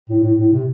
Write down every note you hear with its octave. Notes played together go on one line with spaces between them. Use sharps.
A2
A2
A2
C3